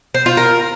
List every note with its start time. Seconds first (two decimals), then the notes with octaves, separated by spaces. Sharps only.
0.15 C5
0.26 F4
0.37 A#4